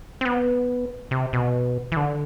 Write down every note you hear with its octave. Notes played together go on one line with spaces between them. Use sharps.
C4
B3
C3
B2
E3
D3